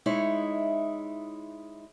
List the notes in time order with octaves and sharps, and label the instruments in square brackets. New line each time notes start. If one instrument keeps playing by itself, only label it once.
[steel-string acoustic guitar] G#3 D#4 E4 C#5